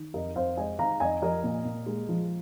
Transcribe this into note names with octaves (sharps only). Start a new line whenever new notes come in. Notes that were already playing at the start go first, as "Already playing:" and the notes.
Already playing: D#3
F2 A#4 D#5
F2 C5 F5
G#3 D#5 G#5
D#3 F5 A#5
F2 D#5 G#5
F3 A#4 D#5
A#2
A#2
G#3
F3